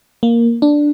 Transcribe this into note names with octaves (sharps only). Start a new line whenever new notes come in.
A#3
D4